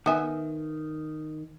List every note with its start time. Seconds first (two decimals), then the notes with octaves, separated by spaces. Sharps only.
0.06 D#3 B3 E5 G#5